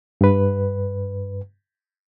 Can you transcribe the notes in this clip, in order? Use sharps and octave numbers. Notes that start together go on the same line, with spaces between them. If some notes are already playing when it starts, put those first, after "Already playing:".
G2 B4